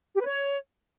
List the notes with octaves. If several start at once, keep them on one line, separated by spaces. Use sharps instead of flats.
G4
B4
C#5